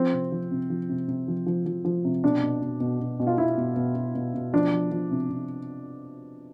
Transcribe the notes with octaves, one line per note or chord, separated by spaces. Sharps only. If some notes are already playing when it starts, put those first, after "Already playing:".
Already playing: F3 C4
C3
F3
C3
F3
C3
C3
F3
F3
F3
F3
C3
B2 D4
B2
B2
B2
B2
B2
F4
B2 E4
B2
B2
B2
B2
B2
F3 D4
F3
F3
C3
C3